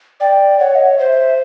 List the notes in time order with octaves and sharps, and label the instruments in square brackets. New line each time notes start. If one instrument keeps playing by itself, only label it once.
[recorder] D5 [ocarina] G5
[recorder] C#5 [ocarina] F#5
[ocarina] D#5
E5
[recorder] C5
[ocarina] E5